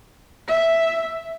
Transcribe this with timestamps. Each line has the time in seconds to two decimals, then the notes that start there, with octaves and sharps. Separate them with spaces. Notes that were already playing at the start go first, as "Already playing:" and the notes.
0.48 E5